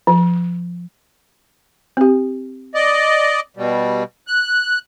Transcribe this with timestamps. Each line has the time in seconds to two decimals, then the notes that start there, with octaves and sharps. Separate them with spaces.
0.07 F3
1.97 C4 G4
2.75 D5 D#5
3.57 B2 G3
4.27 F#6